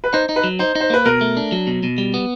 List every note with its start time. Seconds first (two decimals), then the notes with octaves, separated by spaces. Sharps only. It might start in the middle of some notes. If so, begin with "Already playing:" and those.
0.04 B4
0.13 D#4 C5
0.29 D#4
0.36 B4
0.44 F#3
0.59 D#4 C5
0.75 D#4
0.80 C5
0.90 A#3 B4
1.06 B2 A#4
1.21 A3
1.37 D4
1.52 F#3
1.67 B2
1.83 B2
1.98 G3
2.14 B3